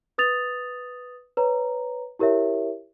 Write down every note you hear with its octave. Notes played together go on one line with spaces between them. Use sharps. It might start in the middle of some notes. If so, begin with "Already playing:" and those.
B4 D#6 A6 F7
B4 C#5 A#5
E4 G4 A#4 C#5 E5